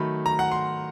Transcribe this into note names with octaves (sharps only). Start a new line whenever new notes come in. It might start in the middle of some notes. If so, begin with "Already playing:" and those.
Already playing: D#3 F#3 A3 B5
A#5
F#5
C6